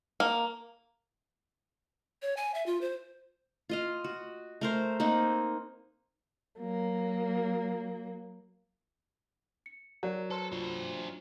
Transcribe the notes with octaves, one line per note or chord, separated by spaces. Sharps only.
A#3
C#5
G#5
E5
F4
C5
F4 D#5 F5
F#4
A3 A#4 C5
A#3 C4 D#4 F#5
F#3 A#3
C#7
F#3 A#4 D5
A4 B4 C5 C6
D4 F4 C5